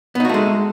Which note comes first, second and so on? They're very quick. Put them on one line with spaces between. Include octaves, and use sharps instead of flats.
B3 D#4 F#4 A3 G#3